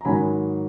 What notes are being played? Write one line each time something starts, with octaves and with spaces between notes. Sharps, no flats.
A#5
G#2 D#3 F#3 G#5 B5